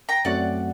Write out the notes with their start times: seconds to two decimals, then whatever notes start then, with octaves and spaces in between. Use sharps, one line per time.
0.09 G5 A#5
0.25 F#2 F#3 A3 C4 F#4 D5 F#5